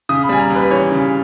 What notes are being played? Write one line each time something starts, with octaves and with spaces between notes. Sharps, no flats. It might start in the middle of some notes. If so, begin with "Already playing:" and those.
C#3 D#6
B5
G3 G#5
A#5
D#2
B4
E3 C#5
C#3